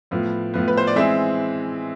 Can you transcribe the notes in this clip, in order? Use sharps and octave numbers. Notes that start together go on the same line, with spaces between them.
A2 F3 B3
A2 F3 B3
B4
C5
D5
E3 G#3 C4 E5